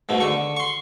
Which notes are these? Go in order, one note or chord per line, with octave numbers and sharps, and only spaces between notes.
G#2 B2 A3
D3 C#6
C6 C#6